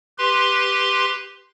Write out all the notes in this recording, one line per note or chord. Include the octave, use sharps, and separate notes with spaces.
G4 B4 C6